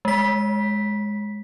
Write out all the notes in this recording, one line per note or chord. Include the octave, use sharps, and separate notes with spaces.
G#3 B6